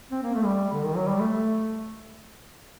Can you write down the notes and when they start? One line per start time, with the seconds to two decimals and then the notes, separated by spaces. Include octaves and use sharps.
0.11 C4
0.22 A#3
0.34 A3
0.45 G3
0.72 D3
0.84 D#3
0.96 F#3
1.08 G3
1.20 A3